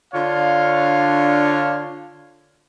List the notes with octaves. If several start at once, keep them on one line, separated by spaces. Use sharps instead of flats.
D3 D4 F4 C#5 F5